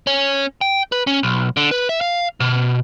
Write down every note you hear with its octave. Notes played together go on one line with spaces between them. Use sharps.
C#4
G5
B4
C#4
B1
D3
B4
E5
F5
B2